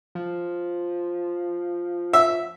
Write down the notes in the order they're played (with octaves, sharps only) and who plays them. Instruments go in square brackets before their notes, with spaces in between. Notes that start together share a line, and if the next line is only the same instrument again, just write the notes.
[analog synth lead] F3
[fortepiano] E5